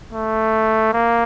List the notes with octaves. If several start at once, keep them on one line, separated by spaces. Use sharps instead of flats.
A3
A#3